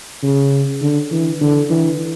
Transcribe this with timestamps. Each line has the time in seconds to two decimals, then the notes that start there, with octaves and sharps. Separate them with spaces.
0.23 C#3
0.82 D3
1.12 E3
1.41 D3
1.70 E3